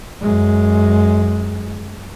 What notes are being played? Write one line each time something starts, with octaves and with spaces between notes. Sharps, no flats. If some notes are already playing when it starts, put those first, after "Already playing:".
F#2 G#3